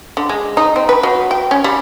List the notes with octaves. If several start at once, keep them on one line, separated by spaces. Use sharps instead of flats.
D3
G#3
D#4
C4
B4
F#3
G5
C#4
G3